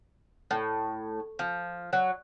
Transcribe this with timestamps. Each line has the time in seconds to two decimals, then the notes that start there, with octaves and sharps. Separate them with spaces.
0.51 A2
1.39 F3
1.93 F#3